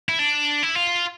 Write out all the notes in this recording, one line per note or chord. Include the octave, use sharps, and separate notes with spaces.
E4
D4
E4
F4